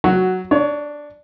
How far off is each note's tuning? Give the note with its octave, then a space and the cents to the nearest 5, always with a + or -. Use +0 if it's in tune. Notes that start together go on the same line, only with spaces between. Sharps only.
F#3 +0 F#4 +10
D4 +0 C#5 +30